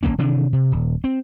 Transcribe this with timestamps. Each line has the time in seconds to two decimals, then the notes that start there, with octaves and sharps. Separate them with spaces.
0.03 G1 G2 A#3 C#4
0.18 C3 D#3 E3 D4
0.53 C3
0.72 D#1
1.04 C4